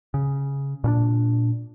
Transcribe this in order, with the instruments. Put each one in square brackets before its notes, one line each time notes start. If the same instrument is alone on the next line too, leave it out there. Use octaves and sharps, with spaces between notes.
[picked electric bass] C#3
A#2 C#4 D4